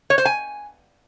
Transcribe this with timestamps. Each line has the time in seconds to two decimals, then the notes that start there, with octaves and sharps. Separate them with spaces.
0.10 C#5
0.18 C5
0.25 G#5